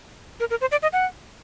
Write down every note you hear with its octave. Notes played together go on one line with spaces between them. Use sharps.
A#4
A#4
C5
D5
D#5
F#5